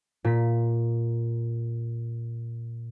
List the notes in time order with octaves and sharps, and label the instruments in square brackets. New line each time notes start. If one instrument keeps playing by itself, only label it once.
[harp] A#2 B6